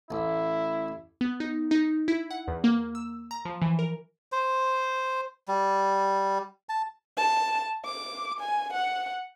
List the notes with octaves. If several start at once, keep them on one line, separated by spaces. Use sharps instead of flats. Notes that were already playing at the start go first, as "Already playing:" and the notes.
A1 E4
B3
D#4
D#4
E4
F#5
E2
A#3
E6
A#5
F3
E3
A#4
C5
G3
A5
A5
D6
G#5
F#5